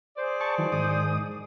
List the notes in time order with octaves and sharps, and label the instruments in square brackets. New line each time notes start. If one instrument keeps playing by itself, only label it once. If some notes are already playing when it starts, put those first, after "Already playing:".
[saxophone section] G#4 C5 D5
[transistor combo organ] A5 C#6
D#3 E3 F#3
G#2 D#3 D#6